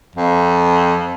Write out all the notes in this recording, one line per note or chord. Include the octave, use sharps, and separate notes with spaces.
F2